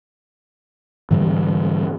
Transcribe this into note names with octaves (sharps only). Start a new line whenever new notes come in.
G#2 D3 E3 G3